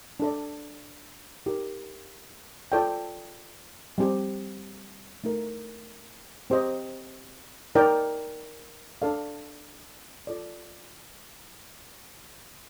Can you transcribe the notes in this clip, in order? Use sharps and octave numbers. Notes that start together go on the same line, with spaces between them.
D4 A4 D5
D#4 G4 A#4
F4 A4 D5 G5
G3 C4 G4
A3 D#4 A#4
C4 G4 C5 D#5
D#4 A#4 D5 G5
D4 A4 D5 F5
F4 A4 D5